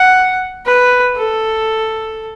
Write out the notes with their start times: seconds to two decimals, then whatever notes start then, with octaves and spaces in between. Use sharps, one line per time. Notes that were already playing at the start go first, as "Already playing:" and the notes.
Already playing: F#5
0.66 B4
1.17 A4